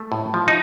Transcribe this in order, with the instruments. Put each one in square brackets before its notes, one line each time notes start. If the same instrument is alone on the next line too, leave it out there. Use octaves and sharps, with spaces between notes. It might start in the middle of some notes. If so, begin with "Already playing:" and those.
Already playing: [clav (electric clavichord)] A3
A2
F3
D#4